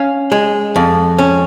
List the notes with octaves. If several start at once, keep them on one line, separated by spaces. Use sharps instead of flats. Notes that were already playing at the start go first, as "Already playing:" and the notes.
Already playing: C#4 F5
G#3
F2
C#4